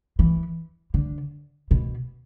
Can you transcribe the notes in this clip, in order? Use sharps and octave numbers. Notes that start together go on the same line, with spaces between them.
E3
D3
B2